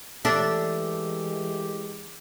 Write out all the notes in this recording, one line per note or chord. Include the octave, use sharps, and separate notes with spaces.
E3 G#3 A3 D4 G4 A4